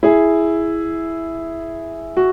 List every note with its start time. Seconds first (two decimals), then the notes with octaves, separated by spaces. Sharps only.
0.03 E4 G#4
2.17 F#4